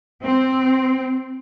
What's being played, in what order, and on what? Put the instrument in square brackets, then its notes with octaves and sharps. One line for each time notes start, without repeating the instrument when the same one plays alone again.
[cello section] C4